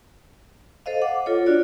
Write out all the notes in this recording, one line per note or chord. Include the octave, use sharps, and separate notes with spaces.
A4 C5 D#5 F5
F#5 D6
F4 A4 C#5
D4 F4 F#4 D5